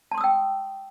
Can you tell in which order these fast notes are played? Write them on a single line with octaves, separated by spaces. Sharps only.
A5 C6 D#6 E6 G5